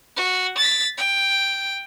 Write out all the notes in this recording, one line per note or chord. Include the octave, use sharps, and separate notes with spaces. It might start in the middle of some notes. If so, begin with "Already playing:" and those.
F#4
A6 B6
G5